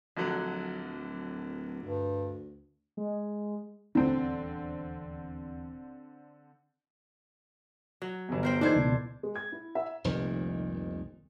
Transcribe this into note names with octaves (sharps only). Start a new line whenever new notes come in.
D1 A#1 D3 F#3
D2 G2
G#3
D#1 E2 D3 C4
F#3
G1 E2
A#4 C5 G5
A#2 E3 D4 D#4 A4 C5 G#6
C#2 B2
G#3
G#6
E4
E5
F1 C2 A#2 D#3